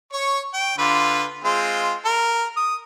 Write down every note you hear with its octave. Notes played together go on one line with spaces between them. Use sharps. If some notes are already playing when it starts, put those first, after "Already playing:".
C#5 C#6
G5
D3 F4 B4
G#3 C4 F4
A#4
D#6